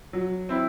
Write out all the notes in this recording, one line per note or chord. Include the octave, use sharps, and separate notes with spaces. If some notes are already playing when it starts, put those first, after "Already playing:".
F#3
C4 E4